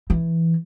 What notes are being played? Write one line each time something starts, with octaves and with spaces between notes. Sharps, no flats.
E3